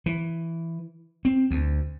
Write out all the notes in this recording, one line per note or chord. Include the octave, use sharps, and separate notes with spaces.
E3
C4
D2